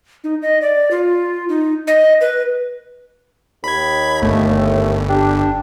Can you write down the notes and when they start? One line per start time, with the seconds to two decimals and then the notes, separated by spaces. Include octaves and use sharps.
0.24 D#4
0.42 D#5
0.62 D5
0.91 F4
1.49 D#4
1.87 D#5
2.21 B4
3.64 D#2 B5 G#6
4.22 G1 A3
5.09 D4 G4